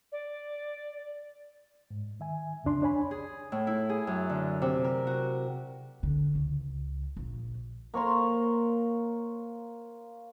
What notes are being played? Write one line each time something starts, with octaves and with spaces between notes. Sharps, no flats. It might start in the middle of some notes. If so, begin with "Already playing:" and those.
D5
G#2
D#3 E5 G#5
C2 F2 C#3 D4 C6
D4 C#5 G#5 B5
G#4
A2
E4
G#4
F#2
D3
C3
A#4
F#4
D3
C#2
A#1
A#3 C#5 A#5 C6